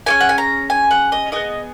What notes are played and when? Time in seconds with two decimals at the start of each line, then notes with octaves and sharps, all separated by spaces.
0.06 C#4 E4 G#4 G#5
0.20 F#5
0.29 G#5
0.38 A#5
0.70 G#5
0.91 F#5
1.12 D#5
1.32 B3 E4 G#4 D#5